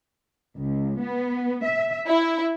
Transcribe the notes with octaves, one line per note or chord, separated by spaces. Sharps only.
C#2
B3
E5
E4